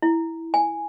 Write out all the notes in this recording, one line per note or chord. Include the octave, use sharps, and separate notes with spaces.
E4
G#5